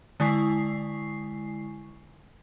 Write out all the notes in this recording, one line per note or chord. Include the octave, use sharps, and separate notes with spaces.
D3 G#3 E4 G#5 C#6 C7